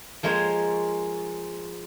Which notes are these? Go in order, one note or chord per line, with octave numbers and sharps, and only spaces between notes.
F3 G#3 A#3 C5 C#5